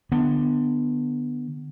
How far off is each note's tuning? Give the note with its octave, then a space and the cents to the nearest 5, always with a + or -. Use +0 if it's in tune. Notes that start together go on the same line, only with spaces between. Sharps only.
D3 +20 B3 +0